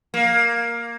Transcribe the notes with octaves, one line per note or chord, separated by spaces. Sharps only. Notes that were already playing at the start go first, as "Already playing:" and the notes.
A#3